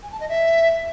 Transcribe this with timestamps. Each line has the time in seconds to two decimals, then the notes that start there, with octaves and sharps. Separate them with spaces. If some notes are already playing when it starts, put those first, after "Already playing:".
0.03 G#5
0.11 A5
0.20 D#5
0.29 E5